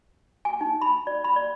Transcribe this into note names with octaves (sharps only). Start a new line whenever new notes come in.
G#5
D#4
B5
D5
B5
D5